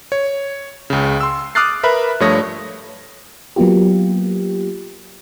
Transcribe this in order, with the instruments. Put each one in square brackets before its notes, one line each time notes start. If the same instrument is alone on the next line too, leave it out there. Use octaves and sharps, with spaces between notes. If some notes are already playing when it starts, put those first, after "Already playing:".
[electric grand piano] C#5
C#2 C#3
C6 E6
D6 D#6 F6 F#6 A6 C7
A#4 B4 E5 B5 F#6
G2 F3 A3 C#5 D#6 A#6
[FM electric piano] F#3 A#3 B3 F4 G4